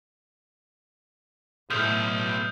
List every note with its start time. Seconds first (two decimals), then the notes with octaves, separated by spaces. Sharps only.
1.70 B1 A2 D#6 F6 G6